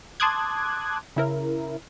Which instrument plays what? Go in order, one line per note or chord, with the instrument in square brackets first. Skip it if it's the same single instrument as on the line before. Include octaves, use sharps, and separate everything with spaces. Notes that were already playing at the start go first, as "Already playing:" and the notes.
[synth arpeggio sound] A5 C6 D6 D#6 F#6 G#6
C#3 E4 A#4